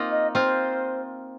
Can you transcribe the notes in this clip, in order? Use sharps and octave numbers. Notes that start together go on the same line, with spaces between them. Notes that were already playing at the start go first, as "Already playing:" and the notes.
Already playing: A#3 C4 D#4 F4
D#5
C4 F4 C5